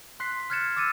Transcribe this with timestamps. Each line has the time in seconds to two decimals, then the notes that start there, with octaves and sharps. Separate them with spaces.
0.20 C6 F#6 B6 C7
0.50 F6 F#6 G#6 A6 C#7 E7
0.77 D6 E6 A6 C#7 D#7